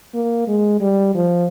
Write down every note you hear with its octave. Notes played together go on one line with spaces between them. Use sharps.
A#3
G#3
G3
F3